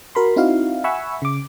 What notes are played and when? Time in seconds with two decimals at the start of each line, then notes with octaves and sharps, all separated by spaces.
0.15 F#4 A#4 B5 C6
0.36 C4 D#4 E4 F#4 F5
0.84 E5 F#5 G#5 B5 C#6 E6
1.22 C#3 D6